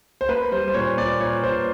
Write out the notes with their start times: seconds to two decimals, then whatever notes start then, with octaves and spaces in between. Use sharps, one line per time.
0.21 C5
0.29 A#3 B4
0.52 G3 C5
0.68 C5
0.74 A#2 C#5
0.97 A#2 D5
1.20 A#2 C#5
1.43 A#2 C5